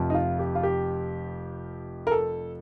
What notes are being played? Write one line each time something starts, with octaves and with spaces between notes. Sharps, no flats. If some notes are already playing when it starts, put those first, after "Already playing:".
Already playing: F1 F2 C3 F3
D#4
F4
G4
F4
G4
A#4
A4